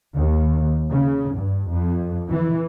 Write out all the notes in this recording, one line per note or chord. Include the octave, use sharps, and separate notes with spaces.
D#2
C#3
G2
F2
E3